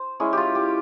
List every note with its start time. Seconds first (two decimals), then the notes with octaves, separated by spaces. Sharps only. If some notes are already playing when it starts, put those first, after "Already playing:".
Already playing: C5
0.20 G#3 C#4 E4 G#4
0.33 F4 G4
0.55 G4